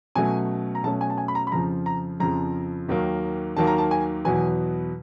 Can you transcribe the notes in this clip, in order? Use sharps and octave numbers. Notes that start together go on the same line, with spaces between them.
B2 F#3 A3 C#4 G#5
A#5
B2 F#3 A3 C#4 A5
G#5
A5
G#5
B5
A#5
B5
F2 C#3 F3 A#5
A#5
F2 C#3 F3 A#5
D#2 D#3 F#3 A#3
D#2 D#3 F#3 A#3 A5
A#5
A5
G#5
E2 B2 F#3 B3 G#5